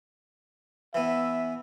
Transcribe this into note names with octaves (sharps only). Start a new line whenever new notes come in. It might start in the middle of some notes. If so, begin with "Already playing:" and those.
E3 B3 E5